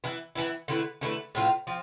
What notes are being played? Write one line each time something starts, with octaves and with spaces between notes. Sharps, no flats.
E3 B3 E4
E3 B3 E4
D3 A3 E4 B4
D3 A3 E4 B4
A2 F3 C4 F4
F3 C4